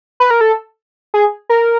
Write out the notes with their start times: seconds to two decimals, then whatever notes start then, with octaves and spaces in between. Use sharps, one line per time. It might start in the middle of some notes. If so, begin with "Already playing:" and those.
0.20 B4
0.31 A#4
0.41 A4
1.14 G#4
1.49 A#4